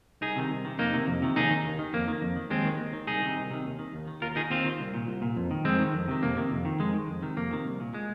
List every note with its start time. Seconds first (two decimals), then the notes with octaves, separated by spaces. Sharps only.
0.21 C2 D#4 G#4
0.36 C3 D#3
0.50 C2
0.65 C3 D#3
0.78 F2 A#3 D#4
0.93 C3 D#3
1.08 F2
1.22 C3 D#3
1.36 D#2 D#4 G#4
1.50 D#3
1.65 D#2
1.79 D#3
1.93 F2 A#3
2.08 D#3
2.22 F2
2.36 D#3
2.50 D#2 G#3 C4
2.65 D#3
2.79 D#2
2.93 D#3
3.07 C2 D#4 G#4
3.22 C3 D#3
3.36 C2
3.51 C3 D#3
3.66 D#2
3.79 D#3
3.93 D#2
4.07 D#3
4.22 D#2 F4 A#4
4.36 D#3 D#4 G#4
4.50 D#2 C4 F4
4.65 D#3
4.80 C2
4.94 A#2
5.08 C2
5.22 A#2
5.36 F2
5.51 D#3
5.65 F2 G#3 C4
5.79 D#3
5.94 F2
6.08 C3 D#3
6.22 F2 A#3
6.36 C3 D#3
6.51 F2
6.65 D#3
6.79 F2 G#3
6.94 D#3
7.08 F2
7.22 C3 D#3
7.37 F2 A#3
7.51 C3 D#3
7.65 C2
7.80 A#2
7.94 G#3